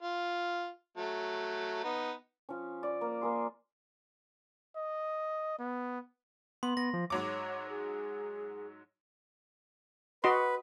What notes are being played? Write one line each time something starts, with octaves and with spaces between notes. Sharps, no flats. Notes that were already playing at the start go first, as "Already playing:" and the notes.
F4
F#3 A3
B3 D#4
F3 C#4
D5
A#3
A#3 G#4 C6
D#5
B3
B3 C6
B3 A#6
F3
G#2 F#3 C#5 D6
G#4
F#4 B4 D#5 C6